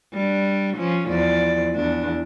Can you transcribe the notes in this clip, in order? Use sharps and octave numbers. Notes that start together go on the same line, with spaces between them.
G3 D4
F3 C#4
E2 F3 D5
E2 D4